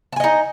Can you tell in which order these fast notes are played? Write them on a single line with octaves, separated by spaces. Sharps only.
A5 G#5 D#5 D#4